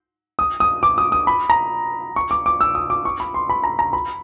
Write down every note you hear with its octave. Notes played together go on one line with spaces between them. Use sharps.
D#6
D#6
D6
D#6
D#6
B5
A#5
C#6
D6
D6
E6
D#6
D6
C#6
B5
C6
B5
A#5
A#5
B5